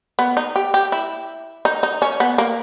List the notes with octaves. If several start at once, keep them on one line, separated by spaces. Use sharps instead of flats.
B3
D#4
G4
G4
E4
D#4
D#4
C#4
B3
A#3